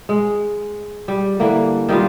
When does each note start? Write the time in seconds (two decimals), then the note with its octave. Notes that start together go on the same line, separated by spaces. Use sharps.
0.09 G#3
1.08 G3
1.40 D3 E3 G3 A#3
1.89 D#3 G3 B3 F4